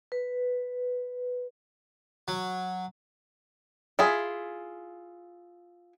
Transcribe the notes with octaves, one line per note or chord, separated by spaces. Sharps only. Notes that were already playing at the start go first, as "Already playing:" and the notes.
B4
F#3
E4 F4 G#4